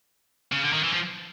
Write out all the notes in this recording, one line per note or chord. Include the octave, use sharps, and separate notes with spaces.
C#3
D3
D#3
E3
F3